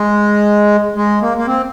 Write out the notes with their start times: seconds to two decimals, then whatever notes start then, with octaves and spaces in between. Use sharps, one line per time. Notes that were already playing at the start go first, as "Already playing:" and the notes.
Already playing: G#3
0.97 G#3
1.22 A#3
1.37 A#3
1.47 C4